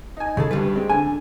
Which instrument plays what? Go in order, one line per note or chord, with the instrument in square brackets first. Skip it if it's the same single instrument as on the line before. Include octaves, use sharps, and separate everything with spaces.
[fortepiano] D#4 G#5
[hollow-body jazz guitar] C#3 G#4 A4
[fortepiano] D2 G2 [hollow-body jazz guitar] G3 B4
[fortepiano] G#3 C4
[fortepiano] D3 [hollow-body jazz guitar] G#5